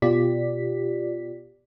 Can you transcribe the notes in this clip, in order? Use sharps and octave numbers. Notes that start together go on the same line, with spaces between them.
B2 F4 G4 D5 B6